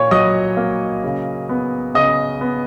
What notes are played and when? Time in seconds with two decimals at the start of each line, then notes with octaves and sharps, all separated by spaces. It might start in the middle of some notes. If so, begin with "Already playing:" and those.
Already playing: A#2 A#3 C#5 C#6
0.11 F#3 D#5 D#6
0.57 A#3
1.04 C#3
1.49 B3
1.94 C#3 D#5 D#6
2.41 B3